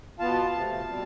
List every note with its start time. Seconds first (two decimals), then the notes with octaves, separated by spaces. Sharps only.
0.19 B2 B3 F4 F5 A5
0.54 C3 F3 A3
0.88 B2 G3 C4